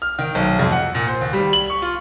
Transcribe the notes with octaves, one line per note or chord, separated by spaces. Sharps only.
F6
D#3
B1
F2
F#5
A#2
C5
D#2
G3
F#7
C#6
F4